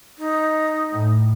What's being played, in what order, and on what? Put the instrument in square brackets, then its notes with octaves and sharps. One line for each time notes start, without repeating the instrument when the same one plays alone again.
[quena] D#4
[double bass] A2